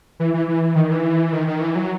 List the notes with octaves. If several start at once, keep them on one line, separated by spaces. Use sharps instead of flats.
E3
E3
E3
D#3
E3
D#3
D#3
E3
F#3